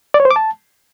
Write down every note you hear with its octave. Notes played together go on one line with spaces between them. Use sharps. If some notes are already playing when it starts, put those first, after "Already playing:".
D5
C#5
C5
D6
A5